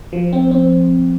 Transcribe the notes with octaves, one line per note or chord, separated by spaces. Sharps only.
F3
C4
C4